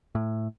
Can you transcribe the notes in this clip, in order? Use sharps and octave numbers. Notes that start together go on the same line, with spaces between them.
A2